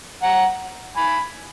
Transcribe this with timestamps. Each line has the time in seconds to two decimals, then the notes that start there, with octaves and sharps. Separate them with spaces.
0.23 F#5 A#5
0.96 G#5 B5